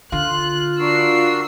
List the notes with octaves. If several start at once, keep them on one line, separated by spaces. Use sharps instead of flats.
D3 F4 F#6
D4 F#4 A#4 E6 C7